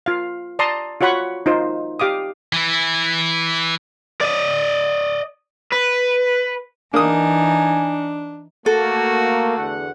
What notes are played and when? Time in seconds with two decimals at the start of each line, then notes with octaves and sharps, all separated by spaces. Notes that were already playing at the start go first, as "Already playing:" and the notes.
0.06 F4 F5
0.59 D5 A5 A#5 C6 D#6
1.01 F4 F#4 C#5 F#5 B5 C#6
1.46 D#4 F4 C5
2.00 G4 F5 D6 D#6
2.53 E3 E4
4.21 D5 D#5
5.72 B4
6.94 E3 A#3 D4 D#4 G#5 D#6
8.66 A3 A#3 F#4 A4
9.57 E2 D3 F#5